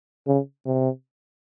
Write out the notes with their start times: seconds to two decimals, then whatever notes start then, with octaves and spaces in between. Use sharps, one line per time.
0.27 C#3
0.66 C3